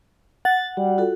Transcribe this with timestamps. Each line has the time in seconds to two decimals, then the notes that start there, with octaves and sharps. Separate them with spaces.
0.45 F#5 A6
0.77 G3 F#4
0.98 F4 F#4 A4